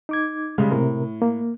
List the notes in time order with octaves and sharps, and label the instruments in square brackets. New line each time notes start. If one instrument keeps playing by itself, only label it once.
[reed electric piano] D#4 D6 G#6
[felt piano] C#3 G3 G#3
[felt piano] A2 [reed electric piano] C3 A#4
[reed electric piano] A#3